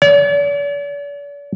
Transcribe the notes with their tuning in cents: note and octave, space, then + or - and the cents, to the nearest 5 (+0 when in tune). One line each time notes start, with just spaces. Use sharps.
D5 -45